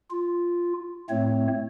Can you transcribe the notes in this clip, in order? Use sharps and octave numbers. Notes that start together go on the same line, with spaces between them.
F4
A2 A3 C4 C#5